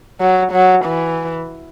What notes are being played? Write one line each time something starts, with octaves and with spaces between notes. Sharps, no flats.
F#3
F#3
E3